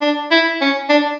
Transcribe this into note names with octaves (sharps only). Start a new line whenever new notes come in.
D4
E4
C#4
D4